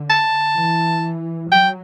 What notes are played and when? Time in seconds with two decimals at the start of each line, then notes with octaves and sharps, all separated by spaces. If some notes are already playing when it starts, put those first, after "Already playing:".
Already playing: D3
0.10 A5
0.57 E3
1.52 F#3 G5